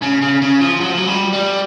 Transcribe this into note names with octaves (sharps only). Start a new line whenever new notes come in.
C#3
C#3
C#3
F3
F#3
F3
F#3
G3
G3